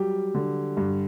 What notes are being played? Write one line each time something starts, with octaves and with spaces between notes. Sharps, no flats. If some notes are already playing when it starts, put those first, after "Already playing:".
Already playing: F#3 G3 G4
D3
G2